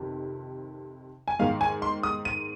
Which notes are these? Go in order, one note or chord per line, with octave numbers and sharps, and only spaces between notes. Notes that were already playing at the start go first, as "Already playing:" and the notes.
Already playing: F2 C3 D#3
G#5
G#2 D#3 F5
G#5
C6
D#6
D#7